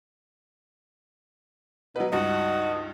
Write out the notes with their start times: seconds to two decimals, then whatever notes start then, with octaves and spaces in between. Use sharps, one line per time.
1.96 B2 F#3 B4
2.12 C#2 G2 D#4 F#4